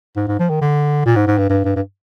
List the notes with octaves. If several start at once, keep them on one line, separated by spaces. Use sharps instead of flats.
G#2
G#2
F3
D#3
D3
A#2
G#2
G#2
G2
G2
G2
G2